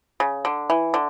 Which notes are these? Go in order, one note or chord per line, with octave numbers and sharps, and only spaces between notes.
C#3
D3
E3
D3